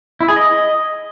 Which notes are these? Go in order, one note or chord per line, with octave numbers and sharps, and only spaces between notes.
E4
G#4
D#5